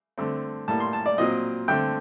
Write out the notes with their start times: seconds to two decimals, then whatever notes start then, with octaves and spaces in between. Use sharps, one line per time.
0.18 D3 A3 C4
0.68 A2 G3 A#3 A5
0.80 C6
0.93 A5
1.06 D5
1.18 A#2 F#3 C4 D#5
1.68 D3 A3 C4 G5